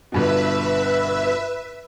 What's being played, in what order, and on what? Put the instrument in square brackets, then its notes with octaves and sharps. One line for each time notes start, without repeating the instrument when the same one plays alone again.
[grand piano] G1 G2 B2 [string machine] B4 E5